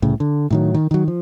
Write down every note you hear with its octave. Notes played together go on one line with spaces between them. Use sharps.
C2 A2 C#3
D3
A2 D#3 F#3
D#3
D#3 F#3
F3